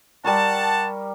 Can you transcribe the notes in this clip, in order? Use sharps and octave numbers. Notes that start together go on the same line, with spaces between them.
G3 A#4 F#5 A5 C#6